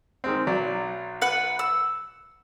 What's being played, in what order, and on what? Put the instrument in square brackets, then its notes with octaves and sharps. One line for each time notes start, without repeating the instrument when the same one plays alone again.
[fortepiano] D#3 G#3 C4
B1 F#3 D5
[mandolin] B4 F#5
E6